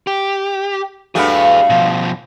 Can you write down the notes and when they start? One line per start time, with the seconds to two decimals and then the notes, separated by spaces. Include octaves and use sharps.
0.07 G4
1.15 G2 A3 F#4 G#4 B4
1.70 B2 F3